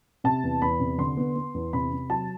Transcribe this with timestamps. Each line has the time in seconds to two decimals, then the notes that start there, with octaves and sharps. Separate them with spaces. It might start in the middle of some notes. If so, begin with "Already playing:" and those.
0.24 C3 A5
0.43 E2
0.62 E2 B5
0.80 C3
0.98 D3 C6
1.17 B3
1.36 B3
1.54 E2
1.73 C3 B5
1.92 C3
2.10 F#3 A5